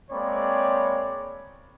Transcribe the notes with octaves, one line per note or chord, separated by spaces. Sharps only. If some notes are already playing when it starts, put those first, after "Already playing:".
G#3 A#3 C4 C#5 D5 B5